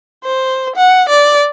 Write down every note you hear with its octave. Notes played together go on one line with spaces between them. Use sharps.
C5
F#5
D5